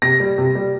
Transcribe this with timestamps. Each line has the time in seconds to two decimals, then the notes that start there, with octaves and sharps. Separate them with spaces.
0.02 C3 A#6
0.20 G3
0.38 C3
0.55 G3